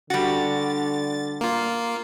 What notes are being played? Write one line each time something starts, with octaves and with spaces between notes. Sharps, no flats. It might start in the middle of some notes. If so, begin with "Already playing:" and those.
D3 G3 F#4 A6
A#3 F4